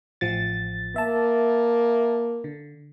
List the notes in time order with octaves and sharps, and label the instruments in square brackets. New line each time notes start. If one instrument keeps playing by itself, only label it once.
[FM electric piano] A1 F3 A6
[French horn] A#3 [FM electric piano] E5 A5
[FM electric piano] D3